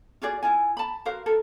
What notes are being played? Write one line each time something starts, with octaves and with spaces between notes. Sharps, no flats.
F4 F#4 G#4 D5
E4 F4 G#5
A5 B5
F#4 A#4 C5 F5
A4 A#4